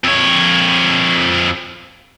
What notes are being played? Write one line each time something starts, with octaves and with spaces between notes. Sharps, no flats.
F2 C#5